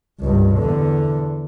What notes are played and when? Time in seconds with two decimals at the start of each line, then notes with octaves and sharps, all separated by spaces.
0.21 C#2 G2
0.58 E2 D3